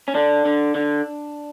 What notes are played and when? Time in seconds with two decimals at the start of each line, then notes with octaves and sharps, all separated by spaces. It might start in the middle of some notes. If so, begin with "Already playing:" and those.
0.08 C#4
0.15 D3 D4
0.45 D3
0.75 D3